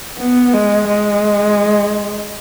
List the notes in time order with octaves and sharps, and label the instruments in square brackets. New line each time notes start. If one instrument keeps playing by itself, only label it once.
[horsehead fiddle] B3
G#3
G#3